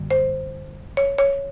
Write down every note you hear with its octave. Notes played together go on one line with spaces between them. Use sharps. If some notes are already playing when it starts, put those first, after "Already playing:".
Already playing: F#2 D3 G3 A#3
C5
C#5
C#5